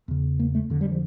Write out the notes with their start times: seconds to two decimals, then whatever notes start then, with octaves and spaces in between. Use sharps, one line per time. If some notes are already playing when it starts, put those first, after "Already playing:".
0.08 E2 C#3
0.39 A#3
0.55 A3
0.70 F2 D3
0.81 G3
0.91 F3